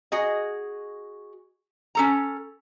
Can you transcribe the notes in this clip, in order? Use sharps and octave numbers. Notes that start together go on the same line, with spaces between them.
F#4 G#4 D#5
C#4 A4 A#5